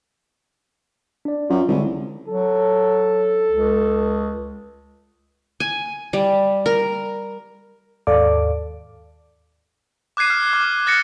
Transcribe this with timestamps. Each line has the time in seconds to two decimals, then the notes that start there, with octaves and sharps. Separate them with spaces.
1.25 D4 D5
1.50 F#2 F4
1.68 C2 D3 G#3
2.28 F#3 A4
3.51 C#2
5.60 G#5
6.13 G3
6.66 A#4
8.07 D#2 G#2 A4 D5 F5 D6
10.17 D6 F#6 G#6 C7 D#7
10.30 F6
10.53 D6
10.86 D#6 F#6 A6 A#6 C7 C#7